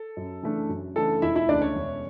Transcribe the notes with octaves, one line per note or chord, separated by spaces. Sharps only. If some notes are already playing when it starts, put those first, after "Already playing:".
Already playing: A4
F#2
C#3 E3 A3 D4
F#2
C#3 E3 A3 D4 A4
E1 E4 E5
E4 E5
D2 C#3 D4 D5
C#4 C#5
E1